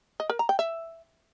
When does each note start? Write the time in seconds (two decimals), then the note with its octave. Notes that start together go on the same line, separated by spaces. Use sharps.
0.20 D#5
0.30 A#4
0.39 A#5
0.49 G5
0.59 E5